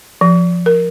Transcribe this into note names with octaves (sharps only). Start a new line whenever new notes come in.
F3
A#4